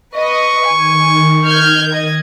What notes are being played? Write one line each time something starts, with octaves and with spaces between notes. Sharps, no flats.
B4 D#5 C#6
D#3 G#5
F6 G6 G#6
D#5 G#6